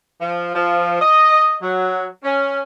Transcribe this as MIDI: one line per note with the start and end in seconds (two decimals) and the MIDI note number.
0.21 0.55 53
0.55 1.00 53
1.02 1.55 75
1.62 2.06 54
2.24 2.61 61